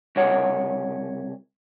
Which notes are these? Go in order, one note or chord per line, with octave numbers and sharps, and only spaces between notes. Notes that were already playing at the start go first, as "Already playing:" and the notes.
C2 C#3 C#5 F#5